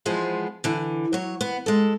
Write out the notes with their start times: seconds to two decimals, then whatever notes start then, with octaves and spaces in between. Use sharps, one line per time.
0.05 E3 F3 G#3 B3 G#4 C5
0.64 D3 E3
1.13 F#3 C#5
1.41 B3
1.66 G#3 A4